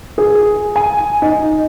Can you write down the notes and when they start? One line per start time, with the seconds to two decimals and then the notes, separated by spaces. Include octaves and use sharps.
0.18 G#4
0.76 G#5
1.22 D#4